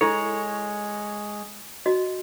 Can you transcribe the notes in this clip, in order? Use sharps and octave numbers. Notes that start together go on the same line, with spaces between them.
G#3 E4 A4 C#5
F#4 D#5